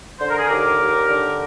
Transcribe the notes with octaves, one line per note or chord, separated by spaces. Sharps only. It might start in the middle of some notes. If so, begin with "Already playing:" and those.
D3 C5
A#4
G#4
D#2 G4 A#4
D#2
D3